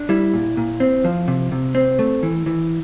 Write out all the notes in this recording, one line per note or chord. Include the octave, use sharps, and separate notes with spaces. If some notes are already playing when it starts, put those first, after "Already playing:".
Already playing: D4
G3 E4
A#2
A#2
C4
F3
C3
C3
C4
A3
E3
E3